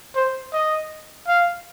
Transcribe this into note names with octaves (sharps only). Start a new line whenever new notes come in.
C5
D#5
F5